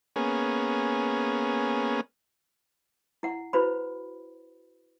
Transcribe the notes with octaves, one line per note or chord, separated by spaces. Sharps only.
A#3 B3 C#4 G#4
E4 F#5
E4 F#4 B4 C5 B5